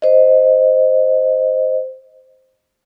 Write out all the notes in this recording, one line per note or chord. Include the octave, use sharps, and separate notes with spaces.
C5 D#5